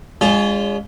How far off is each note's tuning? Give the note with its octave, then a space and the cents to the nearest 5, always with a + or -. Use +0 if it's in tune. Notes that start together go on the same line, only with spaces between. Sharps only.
G#3 -30 C#4 +35 F4 +0